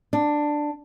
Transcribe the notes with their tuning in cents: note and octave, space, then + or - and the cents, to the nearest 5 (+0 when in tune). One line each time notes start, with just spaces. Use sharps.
D4 +10